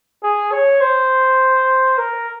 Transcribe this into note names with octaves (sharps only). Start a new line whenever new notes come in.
G#4
C#5
C5
A#4